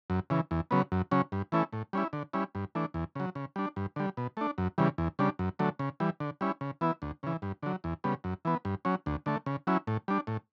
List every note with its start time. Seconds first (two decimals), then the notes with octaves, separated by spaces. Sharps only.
0.10 F#2
0.30 C#3 E3
0.51 E2
0.71 C#3 F#3 B3
0.92 F#2
1.11 C#3 F#3 C#4
1.32 G2
1.52 E3 A3 C#4 E4
1.73 A2
1.93 G3 C#4 E4
2.13 D3
2.33 G3 C#4 E4
2.55 G2
2.75 E3 A3 D4
2.94 E2
3.15 C#3 F#3
3.35 C#3
3.56 G3 D4
3.76 G2
3.96 D3 G3
4.17 B2
4.37 A3 D4
4.58 F#2
4.78 C#3 E3 G3
4.98 E2
5.19 C#3 G3 D4
5.39 F#2
5.59 D3 F#3 A3
5.79 C#3
6.00 E3 G3
6.20 D3
6.41 G3 C#4 E4
6.61 C#3
6.81 E3 B3 E4
7.02 D2
7.23 C#3 E3
7.42 G2
7.63 D3 F#3
7.84 E2
8.04 C#3 G3 B3
8.24 F#2
8.45 E3 B3
8.65 G2
8.85 F#3 C#4
9.06 D2
9.26 D3 A3
9.46 C#3
9.67 F#3 C#4 E4
9.87 A2
10.08 G3 D4
10.27 A2